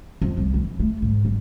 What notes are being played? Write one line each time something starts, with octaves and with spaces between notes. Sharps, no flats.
F2
C2
E3
A3
G#2
G1